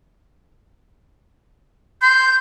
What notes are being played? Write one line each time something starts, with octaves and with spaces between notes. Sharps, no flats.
C6 G6